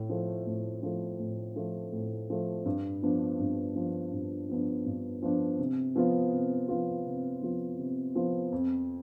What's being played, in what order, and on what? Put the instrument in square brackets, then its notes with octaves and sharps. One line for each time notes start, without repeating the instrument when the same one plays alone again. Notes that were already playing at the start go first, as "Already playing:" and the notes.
Already playing: [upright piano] A2
F3 A3
A2
F3 A3
A2
F3 A3
A2
F3 A3
G2
F3 B3 D4
G2
F3 B3 D4
G2
F3 B3 D4
G2
F3 B3 D4
C3
F3 B3 F4
C3
F3 B3 F4
C3
F3 B3 F4
C3
F3 B3 F4
F2